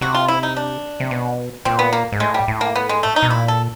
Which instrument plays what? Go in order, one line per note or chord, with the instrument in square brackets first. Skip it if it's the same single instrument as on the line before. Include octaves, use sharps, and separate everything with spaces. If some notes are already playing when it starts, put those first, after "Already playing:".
[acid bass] C3 [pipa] F#4
[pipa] F4
E4
D#4
D4
[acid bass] C3
B2
[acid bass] A#2 [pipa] C4
[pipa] B3
A#3
[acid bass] G#2
[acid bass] A2 [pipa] G#3
[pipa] G3
[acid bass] A2
[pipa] A#3
B3
G#3
A3
D#4
[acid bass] B2
[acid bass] A#2 [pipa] E4
[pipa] A4